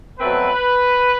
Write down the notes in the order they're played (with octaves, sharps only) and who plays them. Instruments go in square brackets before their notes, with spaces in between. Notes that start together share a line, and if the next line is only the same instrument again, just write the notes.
[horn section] B2 F#3 A3 C4 B4